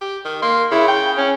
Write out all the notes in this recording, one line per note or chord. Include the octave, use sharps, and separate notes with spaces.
G4
D#3
A#3 C6
C#3 E4
G5
C#4